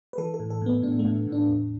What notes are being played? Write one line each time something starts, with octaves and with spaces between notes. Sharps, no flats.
B4
E3 A4
A4
A2
A4
A2 B3
A2 D4
A3
A2
A2
D4
E2